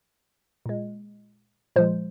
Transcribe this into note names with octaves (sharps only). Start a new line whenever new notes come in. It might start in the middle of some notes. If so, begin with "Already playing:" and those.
A#2 G#3
A#2 F3 G#3 C5